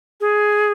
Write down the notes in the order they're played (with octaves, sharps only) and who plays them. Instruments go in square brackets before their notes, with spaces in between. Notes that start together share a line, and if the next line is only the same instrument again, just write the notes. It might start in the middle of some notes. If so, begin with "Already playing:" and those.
[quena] G#4